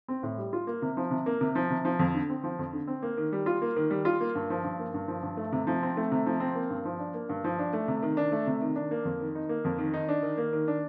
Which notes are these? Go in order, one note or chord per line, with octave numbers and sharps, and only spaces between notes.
C4
A2
G3
F4
A#3
C3
F3
C3
A#3
C3
F3
C3
F3
F2
D3
C4
F3
F2
D3
C4
A#3
D#3
G3
F4
A#3
D#3
G3
F4
A#3
G2
F3
G2
A#3
G2
F3
G2
A3
C3
F3
C4
A3
C3
F3
C4
A#3
G2
F3
D4
A#3
G2
F3
D4
A3
C3
D#3
D4
A3
C3
D#3
D4
A#3
F2
D#3
D#4
A#3
F2
D#3
D#4
D4
D#3
A#3
D#3
D4